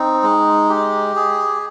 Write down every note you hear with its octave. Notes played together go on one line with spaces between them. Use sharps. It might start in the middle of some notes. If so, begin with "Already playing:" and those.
Already playing: C4 D#4
G#3
G4
G#4